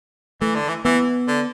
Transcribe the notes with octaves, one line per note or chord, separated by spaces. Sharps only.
E3 A3
D3
E3
E3 B3
D3